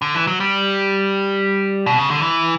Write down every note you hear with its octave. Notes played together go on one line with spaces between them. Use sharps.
D3
E3
F#3
G3
B2
C#3
D3
E3